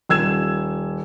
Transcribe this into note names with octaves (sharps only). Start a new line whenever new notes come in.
D#1 E6 G#6 E7